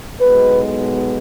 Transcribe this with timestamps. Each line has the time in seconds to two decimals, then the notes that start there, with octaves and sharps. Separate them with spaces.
0.20 B1 B2 G#3 B3 B4